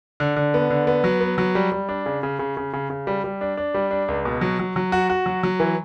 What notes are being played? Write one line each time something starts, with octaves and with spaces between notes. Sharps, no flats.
D3
D3
B3
D3
B3
F#3
B3
F#3
G3
G3
D4
C#3
C#3
C#3
C#3
C#3
C#3
G3
G3
D4
D4
G3
D4
C#2
B2
F#3
F#3
F#3
F#4
F#4
F#3
F#3
E3